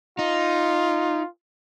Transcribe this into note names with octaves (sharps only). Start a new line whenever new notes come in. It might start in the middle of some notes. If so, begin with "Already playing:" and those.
D#4 F4